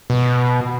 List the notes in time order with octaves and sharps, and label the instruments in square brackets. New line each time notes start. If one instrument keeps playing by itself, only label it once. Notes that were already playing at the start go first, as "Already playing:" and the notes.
[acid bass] B2